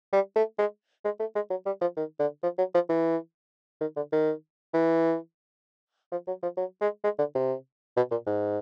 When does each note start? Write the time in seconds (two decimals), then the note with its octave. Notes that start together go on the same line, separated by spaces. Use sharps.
0.13 G3
0.36 A3
0.58 G#3
1.05 G#3
1.20 A3
1.35 G#3
1.50 F#3
1.66 G3
1.81 F3
1.97 D#3
2.19 D3
2.43 F3
2.58 F#3
2.74 F3
2.89 E3
3.81 D#3
3.96 D3
4.12 D#3
4.74 E3
6.12 F3
6.27 F#3
6.43 F3
6.57 F#3
6.81 G#3
7.04 G#3
7.19 D3
7.35 C3
7.97 B2
8.11 A#2
8.26 G#2